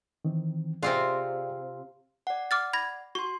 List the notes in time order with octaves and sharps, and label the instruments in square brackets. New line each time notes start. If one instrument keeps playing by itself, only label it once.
[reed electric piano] D#3 E3 C4
[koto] C3 C4 F4 [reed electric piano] G#4 D5 F5
[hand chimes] D5 F#5
[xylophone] D6 F6 A6
B5 G#6 A#6
[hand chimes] F#4 C6 [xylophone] C#6